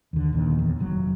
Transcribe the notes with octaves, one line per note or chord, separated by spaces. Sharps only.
D#2 D3
A#1 D#2 D#3
E2
F1 A#2 F#3